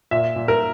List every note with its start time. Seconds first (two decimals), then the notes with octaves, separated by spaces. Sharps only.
0.11 A#2 E5
0.36 A#2
0.48 A#4